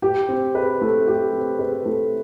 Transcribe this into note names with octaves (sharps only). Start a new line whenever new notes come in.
G4
C4
B4
A3
G4
C4
B4
A3